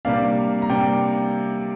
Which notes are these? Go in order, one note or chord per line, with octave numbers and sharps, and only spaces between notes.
C3 G3 A#3 D4 F5
A#5
C3 G3 A#3 D4 G5